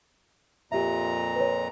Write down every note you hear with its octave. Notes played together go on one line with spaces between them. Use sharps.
F2 A#2 G4 E5 A#5
B4 C#5